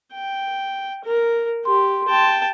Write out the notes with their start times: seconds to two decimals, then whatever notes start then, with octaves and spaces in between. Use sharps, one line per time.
0.14 G5
1.04 A#4
1.65 G4 C6
2.09 G5 A5